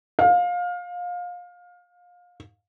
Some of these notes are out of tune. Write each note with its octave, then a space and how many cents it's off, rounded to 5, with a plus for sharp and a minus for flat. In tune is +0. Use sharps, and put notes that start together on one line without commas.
F5 +25